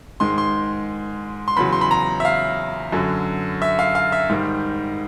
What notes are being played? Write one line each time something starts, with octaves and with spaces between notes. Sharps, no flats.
G#2 D#3 G#3 C6
C6
C6
E2 C#3 F#3 B5
C6
B5
A#5
E5
F5
F#2 D3 F#3
E5
F5
F5
E5
G#2 D#3 G3